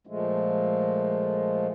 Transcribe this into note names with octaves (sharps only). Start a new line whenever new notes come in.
A#2 F3 G#3 A3